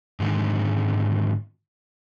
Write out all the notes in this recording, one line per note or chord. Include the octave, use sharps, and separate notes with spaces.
G#2 D3 D#3